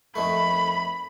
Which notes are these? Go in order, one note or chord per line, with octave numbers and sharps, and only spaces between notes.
F2 D#3 A3 B5